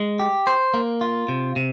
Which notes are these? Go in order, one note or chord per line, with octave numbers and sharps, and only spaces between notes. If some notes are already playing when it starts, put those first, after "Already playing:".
Already playing: G#3
G4
C5
A#3
F4
C3
C3